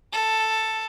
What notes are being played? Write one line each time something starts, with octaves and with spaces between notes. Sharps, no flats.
A4